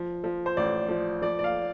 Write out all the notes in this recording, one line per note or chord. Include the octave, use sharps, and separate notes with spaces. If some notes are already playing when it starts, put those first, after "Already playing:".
Already playing: F3
F3
C5
A1 D5
F3
F3 D5
D5
F5